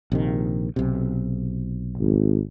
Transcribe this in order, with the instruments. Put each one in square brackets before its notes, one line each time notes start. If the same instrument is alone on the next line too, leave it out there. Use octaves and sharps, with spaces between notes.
[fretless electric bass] A#1 C3 D#3
B1 C3
[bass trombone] G#1